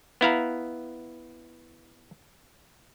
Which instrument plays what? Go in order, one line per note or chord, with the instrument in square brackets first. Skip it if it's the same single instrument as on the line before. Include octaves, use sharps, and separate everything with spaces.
[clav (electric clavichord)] B3 E4 F5 A#5